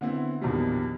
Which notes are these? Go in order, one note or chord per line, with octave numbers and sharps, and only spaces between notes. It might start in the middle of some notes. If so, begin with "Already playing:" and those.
D3 B3 C4 E4
A#1 E2 B2 D#3 F3 G3